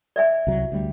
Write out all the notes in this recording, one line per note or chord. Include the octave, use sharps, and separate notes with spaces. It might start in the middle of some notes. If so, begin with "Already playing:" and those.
D5 E5 G#5
C2 F#3
D2 G3